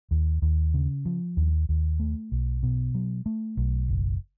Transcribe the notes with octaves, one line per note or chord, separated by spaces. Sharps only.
D#2
D#2
C#3
F3
D#2
D#2
A3
B1
B2
F#3
A3
B1
F#1